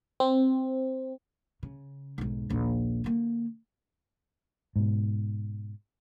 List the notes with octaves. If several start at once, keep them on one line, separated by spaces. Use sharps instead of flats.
C4
C#3
B1 G#2
A#1 D#2
D3 A#3
G#2 B2